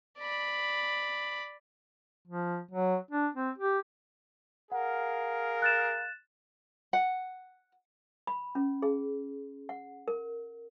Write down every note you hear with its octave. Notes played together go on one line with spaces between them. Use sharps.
D5 B5
F3
F#3
D4
C4
G4
G#4 A#4 F5 F#5
F#6 A6 E7
F#5
B5
C#4
G#4
F#5
A#4